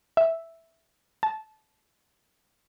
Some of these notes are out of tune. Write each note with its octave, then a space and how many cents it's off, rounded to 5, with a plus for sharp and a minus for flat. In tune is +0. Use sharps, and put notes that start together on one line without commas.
E5 +0
A5 -20